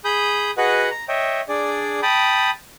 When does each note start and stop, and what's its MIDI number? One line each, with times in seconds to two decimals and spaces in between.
0.05 0.51 68
0.05 0.51 83
0.05 0.51 87
0.05 0.51 91
0.57 0.89 66
0.57 0.89 68
0.57 0.89 71
0.57 0.89 75
0.57 0.89 78
0.91 1.05 82
1.08 1.41 73
1.08 1.41 75
1.08 1.41 76
1.08 1.41 79
1.49 2.01 62
1.49 2.01 68
1.49 2.01 74
2.02 2.51 79
2.02 2.51 81
2.02 2.51 83
2.02 2.51 87